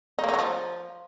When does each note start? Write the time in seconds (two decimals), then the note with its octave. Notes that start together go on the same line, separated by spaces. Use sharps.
0.19 D#4
0.24 A#3
0.29 D#4
0.34 F#3
0.39 F3